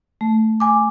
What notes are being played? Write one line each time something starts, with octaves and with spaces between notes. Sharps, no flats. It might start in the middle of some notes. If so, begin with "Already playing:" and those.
A3
G#5 D6